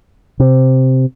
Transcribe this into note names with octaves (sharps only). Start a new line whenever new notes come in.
C3